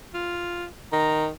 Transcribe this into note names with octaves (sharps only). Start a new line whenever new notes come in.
F4
D#3 A#5